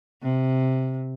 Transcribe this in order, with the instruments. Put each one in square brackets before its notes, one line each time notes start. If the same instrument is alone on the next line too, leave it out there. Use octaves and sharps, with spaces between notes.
[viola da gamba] C3